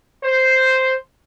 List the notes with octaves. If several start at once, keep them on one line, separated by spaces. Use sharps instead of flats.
C5